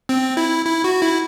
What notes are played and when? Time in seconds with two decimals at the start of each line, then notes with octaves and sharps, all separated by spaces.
0.09 C4
0.37 E4
0.65 E4
0.84 F#4
1.02 E4